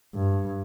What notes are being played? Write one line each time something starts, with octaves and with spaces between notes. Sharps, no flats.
G2